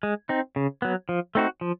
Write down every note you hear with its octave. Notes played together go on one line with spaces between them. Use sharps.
G#3
C4 D#4
C#3
F#3 B3
F3
A3 C4 D#4 F#4
F3